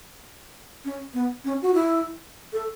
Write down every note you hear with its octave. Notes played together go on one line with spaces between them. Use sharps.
C#4
B3
C#4
F#4
E4
A4